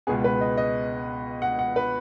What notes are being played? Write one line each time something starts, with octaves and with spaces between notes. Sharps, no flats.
C#2 B2 B3 G#4
B4
D#5
D#5
F#5
F#5
B4